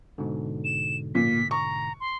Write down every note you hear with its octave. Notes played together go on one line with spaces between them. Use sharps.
G#2 B2 D3
E7
A#2 B6
A#5 C#6
C6